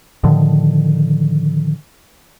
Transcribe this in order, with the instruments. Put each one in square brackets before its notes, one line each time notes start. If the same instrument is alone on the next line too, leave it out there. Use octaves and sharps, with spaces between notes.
[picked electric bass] A2 D3 D#3 F3